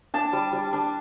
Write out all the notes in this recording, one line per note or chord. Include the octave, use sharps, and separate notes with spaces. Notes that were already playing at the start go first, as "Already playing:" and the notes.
D4 A5
G3
G3
D4